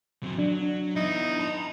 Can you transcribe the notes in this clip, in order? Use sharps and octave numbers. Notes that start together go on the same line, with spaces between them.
F#3 C4
F#3 D4
B3 D#4 E4
A5 A#5